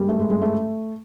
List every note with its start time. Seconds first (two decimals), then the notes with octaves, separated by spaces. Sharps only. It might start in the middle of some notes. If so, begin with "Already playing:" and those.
Already playing: G3 G#3 A#3
0.09 A3
0.20 G#3
0.30 G#3
0.42 A3